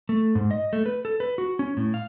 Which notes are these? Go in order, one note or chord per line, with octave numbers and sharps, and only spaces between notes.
A3
G#2
D#5
A3
B4
A4
B4
F#4
C#4
A2
F5